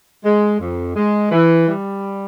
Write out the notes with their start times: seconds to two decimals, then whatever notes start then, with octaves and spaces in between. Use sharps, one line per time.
0.24 G#3
0.60 F2
0.95 G#3
1.31 E3
1.67 G3